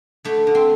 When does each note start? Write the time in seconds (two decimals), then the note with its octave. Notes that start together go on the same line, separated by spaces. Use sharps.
0.24 D3 A3
0.47 D3
0.55 C4